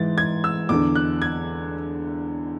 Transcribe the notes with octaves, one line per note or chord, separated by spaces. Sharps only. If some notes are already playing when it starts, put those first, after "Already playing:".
Already playing: G#2 E3 A6
G#6
E6
E2 D3 D6
F#6
G#6